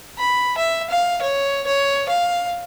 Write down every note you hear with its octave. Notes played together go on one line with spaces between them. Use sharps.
B5
E5
F5
C#5
C#5
F5